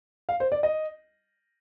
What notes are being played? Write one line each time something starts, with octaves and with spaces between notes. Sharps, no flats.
F5
C5
D5
D#5